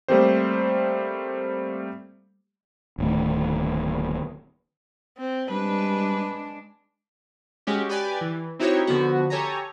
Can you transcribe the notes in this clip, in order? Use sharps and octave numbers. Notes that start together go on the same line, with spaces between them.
G3 A3 A#3 C4 G4 C5
D1 D#3 A3
C4
G3 G#3 D4 B4
G#3 C#4 F#4 G4
G4 B4 D5 G#5
E3
C4 D#4 E4 F#4 G4 C#5
D3 F3 B3 F#4
G4 A4 C#5 G#5 A#5